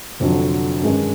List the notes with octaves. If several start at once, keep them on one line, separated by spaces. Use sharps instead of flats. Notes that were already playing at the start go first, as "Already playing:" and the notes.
F1 F2 D3 F#3
G2 D#3 G#3 C#4